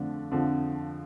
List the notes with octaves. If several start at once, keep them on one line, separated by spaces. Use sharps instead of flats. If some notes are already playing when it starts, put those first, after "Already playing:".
Already playing: F2 D3 F3 A3 D4
F2 D3 F3